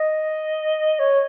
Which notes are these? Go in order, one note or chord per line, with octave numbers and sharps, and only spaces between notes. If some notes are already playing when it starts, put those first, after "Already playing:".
Already playing: D#5
C#5